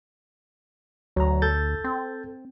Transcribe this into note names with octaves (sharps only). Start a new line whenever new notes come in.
D2 F#3 A#5
A4 G6 A6
C4